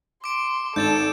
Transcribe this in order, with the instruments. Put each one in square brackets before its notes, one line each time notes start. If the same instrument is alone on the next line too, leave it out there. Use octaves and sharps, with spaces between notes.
[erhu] C6 [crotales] D6 D7
[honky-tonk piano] G#1 [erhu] A4 [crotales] G6 A6 E7